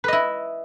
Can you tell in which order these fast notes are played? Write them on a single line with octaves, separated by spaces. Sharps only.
B4 D#5 E4